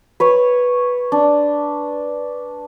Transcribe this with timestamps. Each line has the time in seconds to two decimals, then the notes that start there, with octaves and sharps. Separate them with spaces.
0.20 B4 C#5
1.12 D4